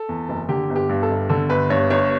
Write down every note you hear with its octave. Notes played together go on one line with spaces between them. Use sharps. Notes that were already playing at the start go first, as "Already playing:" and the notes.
Already playing: A4
E2
F#1
D3 G4
G1
G4
G2
A4
G1
D3 A4
G1 B4
G2 C#5
G1 C#5